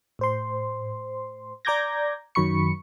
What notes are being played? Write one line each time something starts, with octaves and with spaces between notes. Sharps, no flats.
A2 C5 C6
D5 A#5 D6 G6 G#6 A#6
F#2 D#3 F#3 B5 C#6 C#7